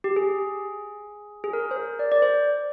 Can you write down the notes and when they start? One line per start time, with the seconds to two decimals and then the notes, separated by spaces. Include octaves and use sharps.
0.04 G4
0.16 G#4
1.44 G#4
1.53 A#4
1.71 C5
1.76 A#4
1.99 D5
2.12 D5
2.22 C5